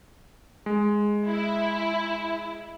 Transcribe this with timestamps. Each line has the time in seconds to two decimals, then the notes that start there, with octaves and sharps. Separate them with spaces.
0.66 G#3
1.28 E4